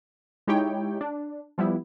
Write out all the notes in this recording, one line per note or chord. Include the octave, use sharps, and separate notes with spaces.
G#3 D#4 E4 G4 C#5 G5
D4
F3 G3 B3 E4